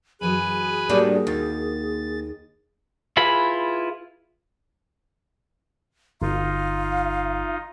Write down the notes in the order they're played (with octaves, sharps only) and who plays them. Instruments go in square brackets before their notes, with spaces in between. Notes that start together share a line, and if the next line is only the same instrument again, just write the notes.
[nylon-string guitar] F#2 E3 F#3 [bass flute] G#4 [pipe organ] B4 G#5 B5
[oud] A2 G3 D4 [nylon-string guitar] A#3 F#4 A#4
[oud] D#2 [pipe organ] A6
[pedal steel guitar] E4 F4 G#4 B4 B5
[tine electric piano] G1 [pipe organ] D#4 F4 [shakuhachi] F5